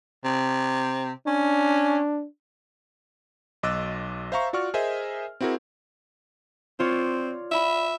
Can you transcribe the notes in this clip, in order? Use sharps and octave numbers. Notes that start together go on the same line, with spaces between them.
C3
C#4 D4
B1 D#5 D6 E6 F#6 A6
C5 E5 F5 A#5 C#6
F4 F#4 D5 C#6 F6
G#4 A#4 C5 D#5 E5 G#5
C4 E4 F#4 G#4 A#4
C4 F4 C#5 D5
E5 B5 E6